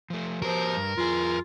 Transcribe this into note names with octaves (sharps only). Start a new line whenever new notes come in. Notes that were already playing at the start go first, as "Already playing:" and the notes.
F3 A3
F3 F#4 G4 A#4 C5
G2
F2 F4 G#4